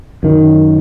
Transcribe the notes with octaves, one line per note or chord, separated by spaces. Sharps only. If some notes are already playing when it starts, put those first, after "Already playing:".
F#2 D#3